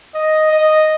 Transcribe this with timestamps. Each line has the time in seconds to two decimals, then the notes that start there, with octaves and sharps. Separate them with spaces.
0.14 D#5
0.51 D#5